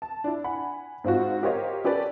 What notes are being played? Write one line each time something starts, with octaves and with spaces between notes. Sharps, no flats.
A5
D4 E4
F#5 G#5 B5
G#2 C4 F4 F#4
G4 A#4 C5 C#5 D#5 F5
C#4 G4 A4 B4 D5